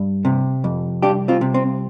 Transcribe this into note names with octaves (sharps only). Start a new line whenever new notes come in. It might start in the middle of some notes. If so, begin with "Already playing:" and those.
Already playing: G2
C3
F2
C2 D4 G4
C4 F4
C3
C4